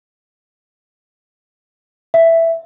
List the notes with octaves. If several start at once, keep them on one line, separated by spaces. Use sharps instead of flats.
E5